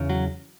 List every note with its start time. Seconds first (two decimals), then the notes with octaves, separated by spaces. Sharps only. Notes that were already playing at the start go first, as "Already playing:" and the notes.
Already playing: E2 C#3
0.09 F#3